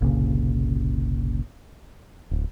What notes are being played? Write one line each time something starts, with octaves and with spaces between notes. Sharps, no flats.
F#1 C2 A#2 C#3
D1